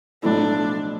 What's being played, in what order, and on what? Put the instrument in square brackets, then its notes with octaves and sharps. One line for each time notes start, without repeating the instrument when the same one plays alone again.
[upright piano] B1 A2 F3 A3 E4 [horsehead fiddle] D4